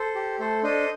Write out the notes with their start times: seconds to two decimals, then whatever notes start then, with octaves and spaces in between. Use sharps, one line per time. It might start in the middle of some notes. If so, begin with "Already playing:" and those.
Already playing: A4 C5
0.15 G4
0.39 A3 A4 C5
0.63 D4 A4 C5 D#5